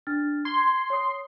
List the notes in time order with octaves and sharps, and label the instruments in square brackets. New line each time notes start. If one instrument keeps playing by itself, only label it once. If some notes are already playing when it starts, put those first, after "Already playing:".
[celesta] D4 F6 A6
[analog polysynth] C6 [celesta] G#6
[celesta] C#5 D#6